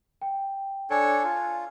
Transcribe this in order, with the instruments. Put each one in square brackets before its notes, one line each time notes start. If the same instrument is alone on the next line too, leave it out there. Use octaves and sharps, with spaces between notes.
[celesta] G5
[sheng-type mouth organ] D4 A4 C#5 [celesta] G#5
[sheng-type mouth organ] F4